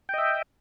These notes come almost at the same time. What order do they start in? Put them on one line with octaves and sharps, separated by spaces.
G5 D#5 E5